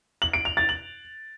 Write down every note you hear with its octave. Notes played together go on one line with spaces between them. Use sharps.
F#7
D7
F7
A6
F#7